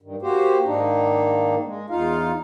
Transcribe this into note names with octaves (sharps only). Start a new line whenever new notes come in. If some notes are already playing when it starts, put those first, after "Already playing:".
G2 D#3
A#3 F#4 G4 C5
G#2 D#3 A#3 D4 D#4
G#3
E2 D#4 F4 F5